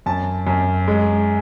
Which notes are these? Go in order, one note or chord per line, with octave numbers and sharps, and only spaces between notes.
F#2 A5
F#2
G#3